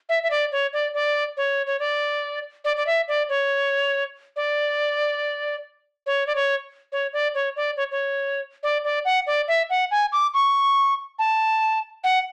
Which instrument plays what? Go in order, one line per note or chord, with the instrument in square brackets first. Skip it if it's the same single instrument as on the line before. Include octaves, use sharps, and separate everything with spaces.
[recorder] E5
E5
D5
C#5
D5
D5
C#5
C#5
D5
D5
D5
E5
D5
C#5
D5
C#5
D5
C#5
C#5
D5
C#5
D5
C#5
C#5
D5
D5
F#5
D5
E5
F#5
G#5
D6
C#6
A5
F#5